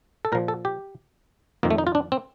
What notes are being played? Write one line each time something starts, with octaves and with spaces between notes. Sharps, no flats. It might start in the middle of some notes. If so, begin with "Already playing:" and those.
A4
A#2 F3 A#4
A4
G4
F2 D#3 A#3
A3
D#4
F4
D4
C4